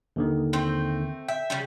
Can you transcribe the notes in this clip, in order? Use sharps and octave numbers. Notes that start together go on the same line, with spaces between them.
D#2 D3 D#3
A3 C4 G5
E5 G5
C#3 F3 G3